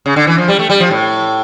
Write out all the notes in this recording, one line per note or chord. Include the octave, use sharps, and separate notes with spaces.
C#3
D3
E3
F3
G3
A3
G3
F3
A2